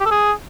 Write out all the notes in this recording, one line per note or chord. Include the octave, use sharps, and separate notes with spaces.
G4
A4
G#4